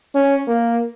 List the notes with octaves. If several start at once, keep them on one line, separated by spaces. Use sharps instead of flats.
C#4
A#3